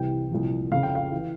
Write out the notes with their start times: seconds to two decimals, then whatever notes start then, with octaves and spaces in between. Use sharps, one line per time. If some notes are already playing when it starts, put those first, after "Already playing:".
Already playing: C2 C3 E3 G5
0.31 C2 A#2 F3
0.71 F2 C#3 F3 F5
0.83 G5
0.95 F5
1.12 E3